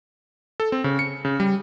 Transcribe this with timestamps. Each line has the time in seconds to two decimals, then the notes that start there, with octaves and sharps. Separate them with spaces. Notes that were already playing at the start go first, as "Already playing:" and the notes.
0.60 A4
0.72 C4
0.84 C#3
0.99 C#7
1.25 C#3
1.40 G3